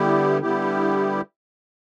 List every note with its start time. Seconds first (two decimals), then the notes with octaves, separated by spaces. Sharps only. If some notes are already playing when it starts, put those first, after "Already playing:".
Already playing: D3 G3 B3 E4 G4
0.42 D3 G3 B3 E4 G4